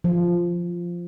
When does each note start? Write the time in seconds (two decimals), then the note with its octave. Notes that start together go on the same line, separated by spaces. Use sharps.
0.04 F3